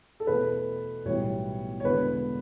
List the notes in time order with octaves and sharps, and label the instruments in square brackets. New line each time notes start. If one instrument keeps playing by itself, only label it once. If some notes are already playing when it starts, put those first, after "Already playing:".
[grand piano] A4
E2 B2 A3 B4
B1 A2 E3 G3 B3 C#5
C#5
E1 E2 D3 B4